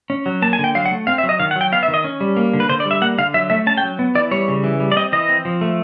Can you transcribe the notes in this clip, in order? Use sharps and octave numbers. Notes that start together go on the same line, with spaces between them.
C#4
F#3
A#3 A5
G#5
D3
G5
F#3 F5
F#5
A3
C4 F5
E5
F#3
D#5
D#3 F5
F#5
F#3
G5
B3 F5
E5
D#3
D#5
C#4
G3
A#3
D3
B4
D3 C5
D5
G3
E5
A#3 F#5
D3 F5
F#3 E5
A3 E5
C#4 A5
G5
F#3
B3
E3 D5
G3 C#5
C#3
E3
G3
D5
C4 D#5
E3 D#5
C4
F3
A3